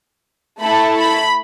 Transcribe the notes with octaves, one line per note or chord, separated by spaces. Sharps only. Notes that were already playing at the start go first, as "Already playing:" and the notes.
A3 E4 A4 B5
B5